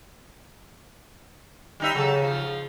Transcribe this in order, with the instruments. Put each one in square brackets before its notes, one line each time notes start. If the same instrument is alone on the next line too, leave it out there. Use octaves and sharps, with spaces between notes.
[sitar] G3 D#4 E5
[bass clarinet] C#3 [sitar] F#3 A4
[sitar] F3